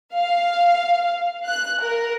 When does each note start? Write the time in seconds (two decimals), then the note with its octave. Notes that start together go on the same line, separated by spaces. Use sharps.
0.14 F5
1.46 F#6
1.81 A#4